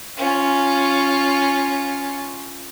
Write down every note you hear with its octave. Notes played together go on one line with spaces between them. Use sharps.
C#4 F4